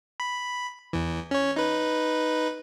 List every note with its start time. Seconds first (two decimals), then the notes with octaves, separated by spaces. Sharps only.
0.20 B5
0.93 E2 E3
1.31 C#4 C#5
1.56 D#4 B4